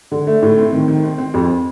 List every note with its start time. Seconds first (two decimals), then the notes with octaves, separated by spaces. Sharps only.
0.12 D3
0.27 A3
0.42 A2
0.57 C4
0.72 D#3
0.88 D#3
1.04 C4
1.18 C4
1.34 F2